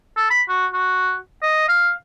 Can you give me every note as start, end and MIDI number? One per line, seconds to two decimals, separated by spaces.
0.17 0.29 69
0.30 0.42 83
0.49 0.66 66
0.73 1.16 66
1.42 1.67 75
1.68 1.91 77